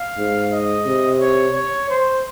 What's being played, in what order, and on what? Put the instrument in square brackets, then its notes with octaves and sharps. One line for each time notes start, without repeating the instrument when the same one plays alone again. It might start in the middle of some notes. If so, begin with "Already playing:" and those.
Already playing: [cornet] F5
[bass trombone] G#2
[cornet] D#5
[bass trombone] C3
[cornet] C#5
C#5
C5